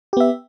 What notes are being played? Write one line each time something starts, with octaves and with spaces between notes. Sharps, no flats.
B3 G4 E5